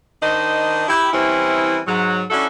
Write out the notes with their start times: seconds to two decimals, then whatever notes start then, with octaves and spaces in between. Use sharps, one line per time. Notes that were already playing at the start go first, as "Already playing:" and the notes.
0.22 D#3 D4 D#4 C5 D#5
0.89 E4 G4
1.13 E3 G3 C4 C#4 E4
1.87 G#2 F#3
2.31 F#3 C#4 D4 E4 F#4 A4